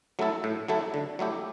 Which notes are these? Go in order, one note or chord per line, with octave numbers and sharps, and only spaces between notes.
F#3 A3 E4 A4
A2
F#3 A3 E4 A4
D3
F#3 A3 E4 G4